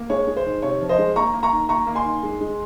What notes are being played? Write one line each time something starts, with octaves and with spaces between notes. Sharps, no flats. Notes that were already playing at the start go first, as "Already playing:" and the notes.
Already playing: A#3
G#3 C#5
G#3
C5
D#3
C3 C#5
F3
C5 D#5
G#3
A#3 A#5 C#6
A#3
A#5 C#6
D#3
A#3 A#5 C#6
A#3
G#5 C6
D#3
G#3
G#3